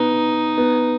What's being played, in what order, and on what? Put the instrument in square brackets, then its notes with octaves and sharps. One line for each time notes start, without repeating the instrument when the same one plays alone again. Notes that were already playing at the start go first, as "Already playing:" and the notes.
Already playing: [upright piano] B3 [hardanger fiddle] D#4
[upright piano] B3